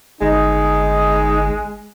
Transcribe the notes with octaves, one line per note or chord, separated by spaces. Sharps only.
G1 G#3 D#4